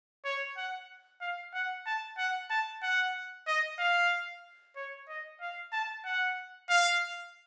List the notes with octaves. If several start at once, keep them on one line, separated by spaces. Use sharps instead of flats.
C#5
F#5
F5
F#5
A5
F#5
A5
F#5
D#5
F5
C#5
D#5
F5
A5
F#5
F5